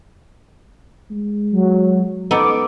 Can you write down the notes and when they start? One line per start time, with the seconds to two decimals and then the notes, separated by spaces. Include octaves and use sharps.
1.11 G#3
1.52 F#3
2.31 B3 D#4 A4 D6